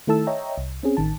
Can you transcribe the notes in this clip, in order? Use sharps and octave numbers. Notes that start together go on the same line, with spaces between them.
D#3 A3 E4 A4 A5 E6
C#5 D#5 E5 G5 A#5
C2
C4 C#4 G#4
A1 D#3 A5